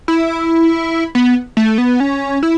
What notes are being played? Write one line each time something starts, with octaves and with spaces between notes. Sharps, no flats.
E4
B3
A3
B3
C#4
E4